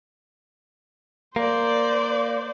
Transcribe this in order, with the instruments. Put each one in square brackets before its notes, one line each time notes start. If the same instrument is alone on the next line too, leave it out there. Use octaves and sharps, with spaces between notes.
[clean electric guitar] A#3 [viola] C5 D5